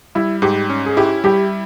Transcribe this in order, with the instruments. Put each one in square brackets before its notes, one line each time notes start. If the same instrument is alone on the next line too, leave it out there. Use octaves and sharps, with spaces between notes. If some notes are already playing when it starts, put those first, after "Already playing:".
[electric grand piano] G3 [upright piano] E4
[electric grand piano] G#2 [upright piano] G4
[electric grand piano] C#4
[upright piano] G#4
[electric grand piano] E4 [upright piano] G4
[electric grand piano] G3 [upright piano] G4